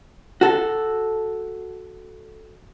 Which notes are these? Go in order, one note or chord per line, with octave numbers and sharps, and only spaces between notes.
F#4 A4